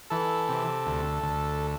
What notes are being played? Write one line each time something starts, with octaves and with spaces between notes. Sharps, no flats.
E3 A4
C3
D2
D2